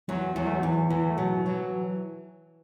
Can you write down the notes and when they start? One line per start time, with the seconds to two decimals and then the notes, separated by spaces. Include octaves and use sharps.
0.08 E2 F#3
0.36 E2 F#3
0.46 A3
0.55 F#3
0.63 E2 E3
0.90 E2 E3
1.10 A3
1.18 B2 F#3
1.45 E3 F#3